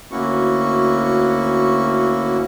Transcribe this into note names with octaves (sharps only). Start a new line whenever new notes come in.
D2 A#3 C#4 E4 F#4 C#6